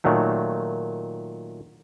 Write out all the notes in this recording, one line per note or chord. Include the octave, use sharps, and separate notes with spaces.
A#2 D#3 F#3 A3